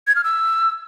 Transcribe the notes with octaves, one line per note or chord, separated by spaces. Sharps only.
G#6
F6
E6